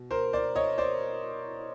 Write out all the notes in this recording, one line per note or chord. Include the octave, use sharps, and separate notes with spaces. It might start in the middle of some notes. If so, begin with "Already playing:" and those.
Already playing: B2
A#4 C5
C5 D5
C#5 D#5
C5 D5